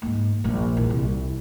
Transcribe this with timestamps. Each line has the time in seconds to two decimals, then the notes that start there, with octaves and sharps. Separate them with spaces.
0.02 G#2 A#3
0.44 A#1 A#3
0.77 E2
0.90 C2